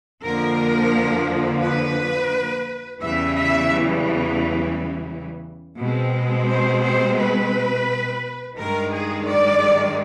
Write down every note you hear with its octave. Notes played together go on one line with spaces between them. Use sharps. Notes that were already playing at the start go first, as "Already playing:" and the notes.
F2 D3 F3 A#3 A#4
B4
E2 C#3 E3 G3 E5
E5
B2 G#3 C4
C5
C5
B4
G2 D#3 G#3 A#4
G#4
D5